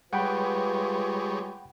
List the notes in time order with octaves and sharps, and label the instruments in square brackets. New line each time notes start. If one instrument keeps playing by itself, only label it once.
[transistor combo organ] G3 G#3 C#5 [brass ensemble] F4 B4 [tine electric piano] F#5 G5 B5